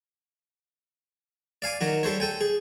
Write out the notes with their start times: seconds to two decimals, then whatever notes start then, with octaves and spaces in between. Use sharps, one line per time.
1.62 D5 F5 G#5 D6
1.81 D#3 F#3 F#4
2.03 G3 A4 C5 C#5
2.20 A4 G5 G#5
2.41 G#4